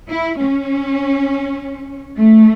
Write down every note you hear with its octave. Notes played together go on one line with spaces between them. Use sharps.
E4
C#4
A3